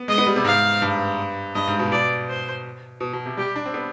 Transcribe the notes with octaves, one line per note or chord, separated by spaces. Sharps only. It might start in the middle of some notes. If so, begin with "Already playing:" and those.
Already playing: B3
G#3 D#5
B3
G3
C3
G#2 F5
G2
G2 D#5
G#2
B2
B2 D5
C5
B2
B2
C3
G3 G4
D4
C4
B3